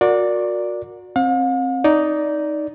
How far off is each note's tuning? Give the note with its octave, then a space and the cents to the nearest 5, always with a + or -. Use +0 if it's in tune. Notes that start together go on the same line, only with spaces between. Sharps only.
F#4 -30 A#4 +0 D5 +0
C4 +20 F5 +45
D#4 +0 D5 -15